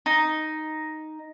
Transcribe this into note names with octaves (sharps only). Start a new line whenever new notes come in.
D#4